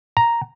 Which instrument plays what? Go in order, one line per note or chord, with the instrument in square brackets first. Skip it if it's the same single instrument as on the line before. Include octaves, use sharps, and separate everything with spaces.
[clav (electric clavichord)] A#5